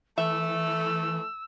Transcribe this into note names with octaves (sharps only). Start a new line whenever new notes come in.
E3 A3 E5 E6